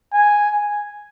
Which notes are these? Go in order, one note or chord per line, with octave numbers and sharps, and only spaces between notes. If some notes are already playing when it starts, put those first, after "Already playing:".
G#5